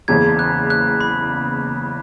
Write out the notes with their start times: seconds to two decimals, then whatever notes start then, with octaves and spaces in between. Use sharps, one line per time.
0.08 F#1 E2 C#3 G#6
0.39 F#6
0.70 F#6
1.01 B5